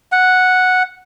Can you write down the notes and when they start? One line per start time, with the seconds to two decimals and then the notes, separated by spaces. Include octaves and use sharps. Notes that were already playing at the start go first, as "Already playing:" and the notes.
0.12 F#5